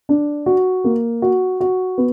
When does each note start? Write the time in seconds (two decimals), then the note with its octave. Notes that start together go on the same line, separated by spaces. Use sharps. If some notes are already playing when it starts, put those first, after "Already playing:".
0.09 D4
0.46 F#4
0.84 A#3
1.22 F#4
1.60 F#4
1.98 B3